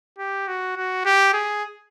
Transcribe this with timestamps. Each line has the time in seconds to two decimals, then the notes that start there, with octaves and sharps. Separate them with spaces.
0.18 G4
0.48 F#4
0.76 F#4
1.05 G4
1.33 G#4